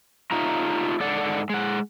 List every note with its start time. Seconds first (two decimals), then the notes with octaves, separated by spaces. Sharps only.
0.31 A3 D#4 F4 A#5
1.00 G#2 A4 D5 F#5
1.50 G#3 F#5